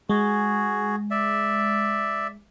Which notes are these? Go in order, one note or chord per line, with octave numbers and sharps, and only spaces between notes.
G#3 F#4 G#4
D5 E5